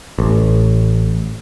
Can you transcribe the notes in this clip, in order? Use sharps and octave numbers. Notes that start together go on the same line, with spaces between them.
A1